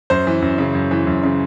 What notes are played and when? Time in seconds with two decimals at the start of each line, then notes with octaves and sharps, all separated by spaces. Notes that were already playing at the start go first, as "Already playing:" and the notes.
0.10 F#2 C5
0.27 E3
0.42 F#2
0.58 C#3
0.75 F#2
0.91 E3
1.07 F#2
1.23 C#3